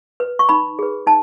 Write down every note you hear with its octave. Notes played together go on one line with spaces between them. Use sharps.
B4
C#6
D#4 B5
G#4 B4
D#4 A5